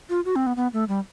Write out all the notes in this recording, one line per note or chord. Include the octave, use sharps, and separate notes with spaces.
F4
F#4
C4
B3
B3
A3
G3